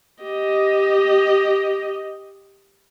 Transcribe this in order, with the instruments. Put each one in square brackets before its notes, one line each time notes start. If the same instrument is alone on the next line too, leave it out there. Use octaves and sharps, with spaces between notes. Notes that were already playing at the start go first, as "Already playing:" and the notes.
[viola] G4 D#5